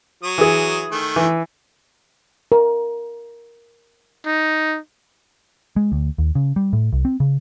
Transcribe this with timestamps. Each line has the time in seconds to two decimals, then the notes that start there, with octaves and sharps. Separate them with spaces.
0.23 F#3 D#6
0.38 E3 G#4
0.91 D#3 A3
1.16 E3
2.52 A#4
4.26 D#4
5.76 G#3
5.92 D2
6.18 D#2
6.35 C#3
6.56 G3
6.73 A2
6.93 C2
7.05 C4
7.20 C#3